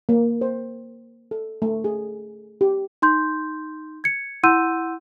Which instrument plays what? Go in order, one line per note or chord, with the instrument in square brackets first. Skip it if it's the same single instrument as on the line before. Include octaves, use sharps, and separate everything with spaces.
[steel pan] A#3
C5
A4
A3
G#4
G4
[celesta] D#4 C6 G6
G#6 C#7
E4 F#5 C6 E6 G6 D#7